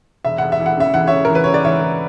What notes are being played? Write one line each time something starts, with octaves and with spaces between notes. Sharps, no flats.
E1 E5
E1 F#5
E5
E3
F#5
C#3 E5
E3 F#5
C#3 C#5 E5
A#4
E3
B4
C#3 C#5
D5
E3 C#5 E5
E3